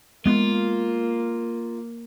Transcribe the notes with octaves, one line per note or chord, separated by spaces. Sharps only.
G#3 A#3 B3 F4